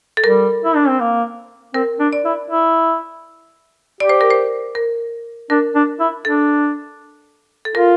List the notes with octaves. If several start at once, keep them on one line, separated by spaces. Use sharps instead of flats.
A4
G3 A#4
E4
D4
C4
A#3
C4 A#4
D4
D5
E4
E4
G4 D5
C5
A#4
C5
A#4
D4 A#4
D4
E4
D4 A4
A4
F4 A#4